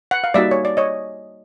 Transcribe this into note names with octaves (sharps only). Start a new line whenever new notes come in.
F#5
F5
G3 A#3 D#4 F#4 D5 E5
C#5
D5
C#5 D#5